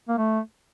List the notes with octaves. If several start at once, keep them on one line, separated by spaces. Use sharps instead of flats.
A#3
A3